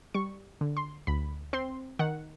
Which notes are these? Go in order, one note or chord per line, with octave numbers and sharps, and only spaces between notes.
G3 C#6
D3
C6
D2 B5
C4 C6
D#3 F#5